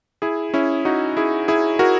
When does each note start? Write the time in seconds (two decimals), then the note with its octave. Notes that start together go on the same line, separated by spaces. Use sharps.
0.22 E4 G#4
0.54 C#4 E4
0.85 D#4 F#4
1.17 E4 G#4
1.48 E4 G#4
1.79 F#4 A#4